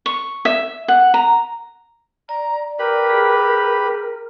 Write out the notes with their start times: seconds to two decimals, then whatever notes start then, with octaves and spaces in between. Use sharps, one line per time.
0.06 C#6
0.45 E5
0.88 F#5
1.14 A#5
2.29 D5 A#5
2.79 G4 A#4 B4 B5
3.10 G#4